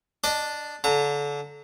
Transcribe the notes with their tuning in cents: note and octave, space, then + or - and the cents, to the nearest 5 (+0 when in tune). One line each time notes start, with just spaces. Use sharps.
D4 +0 D#5 -25 D6 +0
D3 -30 A#5 -35